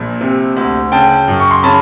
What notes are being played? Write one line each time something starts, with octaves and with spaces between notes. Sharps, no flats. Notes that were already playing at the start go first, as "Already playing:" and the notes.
Already playing: A#1 A#2
C3
D2
C#3 G5 A5
F#2
C#6
C6
C#3 A5 B5